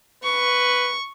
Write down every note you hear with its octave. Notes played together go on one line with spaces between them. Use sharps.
B4 C#6